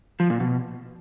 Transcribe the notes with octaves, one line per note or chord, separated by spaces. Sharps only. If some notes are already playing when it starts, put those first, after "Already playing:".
F3
A#2
B2